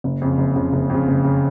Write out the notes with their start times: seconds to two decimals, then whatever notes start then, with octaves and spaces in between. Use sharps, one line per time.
0.04 F#1
0.22 F2 C#3
0.38 F#1
0.56 F2 C#3
0.73 F#1
0.90 F2 C#3
1.08 F#1
1.24 C#3